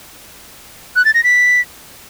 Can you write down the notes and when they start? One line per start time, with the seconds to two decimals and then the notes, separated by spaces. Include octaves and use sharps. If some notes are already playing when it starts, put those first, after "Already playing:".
0.96 F#6
1.05 A6
1.14 A#6
1.24 B6